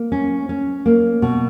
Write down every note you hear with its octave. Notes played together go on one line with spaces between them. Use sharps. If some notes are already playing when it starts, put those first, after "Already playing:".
Already playing: A#3
C#4
C#4
A#3
B2